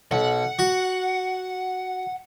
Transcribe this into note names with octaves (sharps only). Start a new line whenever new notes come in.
B1 F#5
F#4